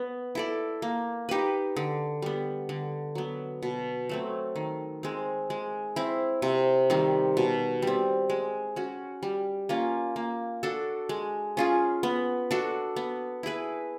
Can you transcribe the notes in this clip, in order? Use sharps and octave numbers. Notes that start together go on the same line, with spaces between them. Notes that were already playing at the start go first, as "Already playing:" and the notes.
Already playing: B3
E4 A4 D5
A#3
D#4 G4 B4
D3
G3 B3
D3
F#3 B3
B2
F#3 A3 C4
D#3
G#3 C4
G#3
C4 E4
C3
D#3 G3 C4
B2
G3 C4
G#3
C#4 F#4
G3
A#3 C#4 F4
A#3
D4 F#4 A4
G#3
C#4 F4 G#4
B3
D4 F#4 A4
B3
E4 G#4 B4